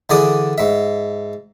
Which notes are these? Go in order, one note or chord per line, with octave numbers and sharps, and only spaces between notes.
D3 E3 G#4 D5 D#6
G#2 E5